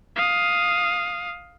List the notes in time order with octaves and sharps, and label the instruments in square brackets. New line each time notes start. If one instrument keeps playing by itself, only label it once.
[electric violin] F5 D#6